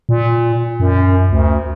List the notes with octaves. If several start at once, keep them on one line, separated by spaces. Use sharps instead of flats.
A#2
F#2
D2